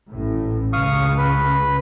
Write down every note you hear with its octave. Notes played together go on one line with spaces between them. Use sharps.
A1 A2
C#2 F5 C#6 D#6
B4